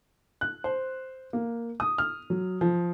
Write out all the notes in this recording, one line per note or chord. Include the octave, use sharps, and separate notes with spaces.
F#6
C5
A#3
D#6
F6
F#3
F3